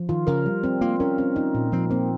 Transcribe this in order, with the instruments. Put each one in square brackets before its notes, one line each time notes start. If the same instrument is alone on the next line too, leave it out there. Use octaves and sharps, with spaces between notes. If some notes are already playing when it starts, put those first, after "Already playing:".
Already playing: [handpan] F3
[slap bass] D#3 [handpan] F4
[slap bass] C#3 [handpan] A#4
[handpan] G3
C4
[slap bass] A#3 [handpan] F4
[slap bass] C#4 [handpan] A#4
[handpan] C4
D#4
A#2
[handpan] F3 [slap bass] C4
[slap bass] A#3 [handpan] C4